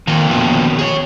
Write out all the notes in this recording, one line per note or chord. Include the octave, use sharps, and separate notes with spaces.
F2 A#2 D#3
D#3 B3 F#4
G#4 C#5